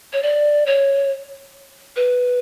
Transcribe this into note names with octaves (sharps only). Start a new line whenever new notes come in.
C#5
D5
C#5
B4